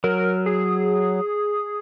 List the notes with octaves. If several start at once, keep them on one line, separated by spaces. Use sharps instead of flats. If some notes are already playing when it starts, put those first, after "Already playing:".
F#3 A#4
G#4